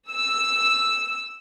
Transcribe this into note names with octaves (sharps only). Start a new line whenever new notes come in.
E6